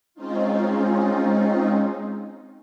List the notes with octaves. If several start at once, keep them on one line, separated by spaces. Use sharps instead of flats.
G#3 C4 C#4 D#4 F4